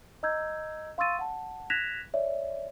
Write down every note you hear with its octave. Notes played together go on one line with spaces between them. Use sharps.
D#5 A#5 E6 G6 G#6
F5 C6 C#6 E6 A6 D#7
F#5 A5
F#6 G#6 A#6 B6 E7 F7
C#5 D5 E5